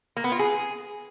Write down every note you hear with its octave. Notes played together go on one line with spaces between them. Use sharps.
A#3
B3
F4
G#4